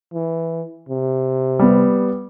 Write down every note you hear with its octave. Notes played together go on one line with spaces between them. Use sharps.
E3
C3
G3 B3